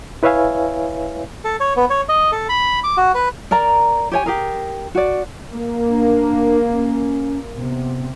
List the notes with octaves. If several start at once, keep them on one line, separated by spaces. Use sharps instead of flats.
E4 B4 C#5 E5 F5 G#5
A4
C#5
B3
C#5
D#5
A4
B5
D6
F#4
B4
A#4 D5 A#5
G4 C#5 G#5
G4 G#4 A#4
F#4 D5
A#3
D4
C#4
C3 B3